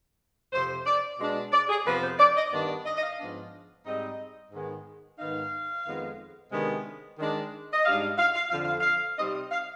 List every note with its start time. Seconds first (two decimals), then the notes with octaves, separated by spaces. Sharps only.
0.53 F2 C3 F3 C5
0.86 D5
1.19 B2 G#3 D4
1.52 D5
1.69 G#4
1.86 F2 C3 F3 B3 B4
2.02 C5
2.19 D5
2.36 D#5
2.52 G2 D#3 B3 D4 D5
2.69 D5
2.85 D#5
2.97 D#5
3.03 F5
3.19 G#2 F3 B3 D4
3.85 G#2 G3 C4 D#4 D#5
4.52 G#2 D#3 G#3 B3
5.19 G#2 D#3 B3 D#4 F5
5.85 F2 D#3 G#3 B3
6.51 C3 D#3 G#3 B3 D4
7.19 D#3 G#3 D4
7.73 D#5
7.85 G#2 G3 D4 F5
8.18 F5
8.34 F5
8.50 F2 D3 F3 F5
8.65 F5
8.81 F5
9.18 C3 G3 C4 D#4 D#5
9.52 F5